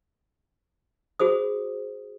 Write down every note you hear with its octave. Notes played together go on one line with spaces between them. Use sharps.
F#4 G#4 C5 D#6